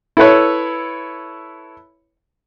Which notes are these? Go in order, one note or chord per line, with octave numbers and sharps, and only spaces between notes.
E4 A4 B4 C#5